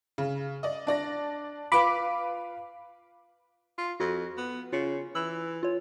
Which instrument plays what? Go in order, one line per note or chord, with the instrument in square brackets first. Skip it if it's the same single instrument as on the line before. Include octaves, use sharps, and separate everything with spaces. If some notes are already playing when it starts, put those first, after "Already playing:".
[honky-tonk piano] C#3
D5 D#5
D4 D5 A#6
[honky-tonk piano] F4 B4 F5 [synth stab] B5 D6
[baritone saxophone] F4
[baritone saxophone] F2 [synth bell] F#4
[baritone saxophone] B3
[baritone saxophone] C#3 [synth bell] F4
[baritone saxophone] E3 [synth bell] E6
[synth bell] F4 C#5